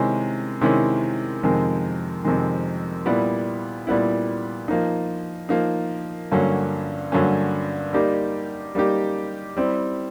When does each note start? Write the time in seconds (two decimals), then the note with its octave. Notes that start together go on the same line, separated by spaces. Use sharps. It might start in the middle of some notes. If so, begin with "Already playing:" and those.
Already playing: C3 D#3 G#3 C#4 E4
0.61 C3 D#3 G#3 C#4 E4
1.43 F2 C3 D#3 G#3
2.24 F2 C3 D#3 G#3
3.06 A#2 G3 B3 E4
3.87 A#2 G3 B3 E4
4.68 F3 A#3 D#4
5.49 F3 A#3 D#4
6.31 G2 D3 F#3 A#3 C#4
7.12 G2 D3 F#3 A#3 C#4
7.93 G3 A#3 D#4 G4
8.75 G3 A#3 D#4 G4
9.57 G3 C4 E4